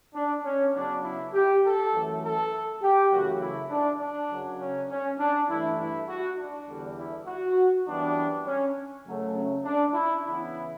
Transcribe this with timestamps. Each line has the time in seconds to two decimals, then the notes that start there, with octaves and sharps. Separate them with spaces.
0.15 D4
0.44 C#4
0.74 C#3 F#3 B3 D4
1.04 E4
1.34 G4
1.63 A4
1.92 F#2 E3 A3
2.23 A4
2.82 G4
3.11 F#2 C#3 E3 A3 F#4
3.41 E4
3.71 D4
4.00 D4
4.30 F#2 C#3 F#3
4.60 C#4
4.90 C#4
5.19 D4
5.49 G2 E3 A3 E4
5.79 E4
6.08 F#4
6.38 D4
6.68 E2 D3 G3
6.97 E4
7.27 F#4
7.87 F#2 E3 G3 B3 D4
8.46 C#4
9.05 F#2 C#3 F#3 A3
9.35 C#4
9.64 D4
9.94 E4
10.24 C#3 E3 B3 E4